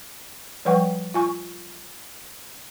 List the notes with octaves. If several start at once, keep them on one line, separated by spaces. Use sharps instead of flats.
F3 G3 B4 F#5 G5 C#6
F4 G#5 C#6